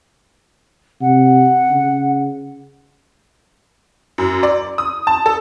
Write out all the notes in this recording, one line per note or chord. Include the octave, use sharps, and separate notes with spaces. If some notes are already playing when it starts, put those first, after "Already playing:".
C3 F#5
C#3
F#2
D5
D#6
A5
A4